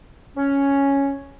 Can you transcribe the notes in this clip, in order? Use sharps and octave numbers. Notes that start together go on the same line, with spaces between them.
C#4